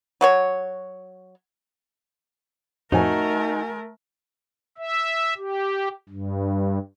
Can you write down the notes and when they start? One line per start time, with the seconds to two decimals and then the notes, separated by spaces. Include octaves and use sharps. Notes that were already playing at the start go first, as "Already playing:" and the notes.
0.21 F#3 F#4 C#5
2.92 F2 A2 F3 A3 D#4 F#4 A#4 G#5
4.78 E5
5.37 G4
6.09 G2